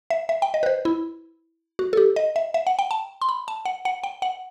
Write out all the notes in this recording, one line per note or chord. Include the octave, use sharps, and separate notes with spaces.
E5
E5
G5
D#5
B4
C5
E4
F#4
A4
G4
D#5
E5
E5
F#5
G5
A5
C6
B5
A5
F#5
F#5
G5
F#5